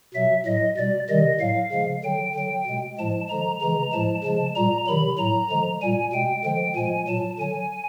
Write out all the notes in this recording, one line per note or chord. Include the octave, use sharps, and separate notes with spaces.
B2 F#3 E5
A2 F#3 D#5
B2 G3 D5
C3 D#3 G3 D#5
A2 F#3 F5
C#3 F3 G#3
D3 F#3 G5
D3 F#3 G5
B2 G#3
A2 F3 G#3 A5
D3 F3 G#3 A#5
C#3 E3 G#3 A#5
A2 F3 G#3 A5
C#3 F3 G#3 A5
A#2 G3 A#5
C3 D#3 F#3 B5
A2 F#3 A#5
D3 F3 G#3
A#2 G3 G#5
B2 G#3 G5
D3 F3 G#3 G5
A#2 F3 G#3 G#5
A#2 F#3 A5
D3 F#3 G#5